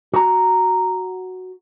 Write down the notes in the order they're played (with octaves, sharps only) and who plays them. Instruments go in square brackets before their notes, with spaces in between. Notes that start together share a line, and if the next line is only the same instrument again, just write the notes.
[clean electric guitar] F#4 A#5